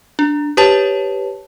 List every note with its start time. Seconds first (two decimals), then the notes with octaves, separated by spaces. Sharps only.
0.19 D4
0.57 G4 B4 C#5 A5